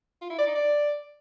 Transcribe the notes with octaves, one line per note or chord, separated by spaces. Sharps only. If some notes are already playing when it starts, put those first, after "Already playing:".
F4
E4
D5
D#4
D5